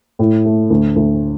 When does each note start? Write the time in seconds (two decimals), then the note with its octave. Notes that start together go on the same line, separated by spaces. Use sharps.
0.19 A2
0.45 A3
0.70 D2
0.96 D2